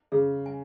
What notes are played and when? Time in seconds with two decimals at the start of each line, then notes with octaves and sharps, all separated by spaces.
0.12 C#3 G#4
0.46 G#5